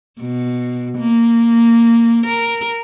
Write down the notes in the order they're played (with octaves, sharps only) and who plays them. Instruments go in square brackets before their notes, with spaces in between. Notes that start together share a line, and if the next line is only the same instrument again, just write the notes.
[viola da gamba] B2
A#3
A#4